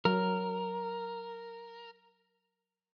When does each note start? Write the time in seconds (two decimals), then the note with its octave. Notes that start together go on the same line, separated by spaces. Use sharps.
0.05 F#3 A#4